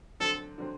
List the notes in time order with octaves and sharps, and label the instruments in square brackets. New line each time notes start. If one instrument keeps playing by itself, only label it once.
[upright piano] D3 F#3 C4 [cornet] A4
[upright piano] D3 F#3 C4